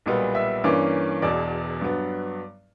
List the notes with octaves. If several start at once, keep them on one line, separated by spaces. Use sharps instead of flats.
B1 A#2 G3 B3
E5 E6
G2 E3 A#3 C#4 D5 D6
E1 E2 B2 D5 D6
G2 F#3 B3